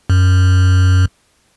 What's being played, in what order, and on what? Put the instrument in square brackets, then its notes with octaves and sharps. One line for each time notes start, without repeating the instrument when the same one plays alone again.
[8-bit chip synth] F#2